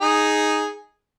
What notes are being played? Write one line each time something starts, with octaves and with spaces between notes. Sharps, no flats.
D#4 G#4